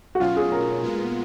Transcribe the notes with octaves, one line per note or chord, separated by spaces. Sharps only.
F#4
B2 F#3 C#4 F4
G#4
A#4
A#2 G#3 B3 F4